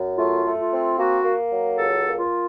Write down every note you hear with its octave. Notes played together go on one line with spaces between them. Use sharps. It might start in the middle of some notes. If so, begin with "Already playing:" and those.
Already playing: F#2
A3 F4
A3
F4
C4
A#3 F#4
A#3
F#3
C#2 A4
A#3
F4